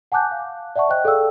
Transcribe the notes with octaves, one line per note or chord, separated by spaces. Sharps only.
F#5 G#5 A5 D6 F#6 G6
F5
D5 E5 F#5 A5 C#6
C5 D#5 G5 F#6
G#4 A4 D5 F5 G5 E6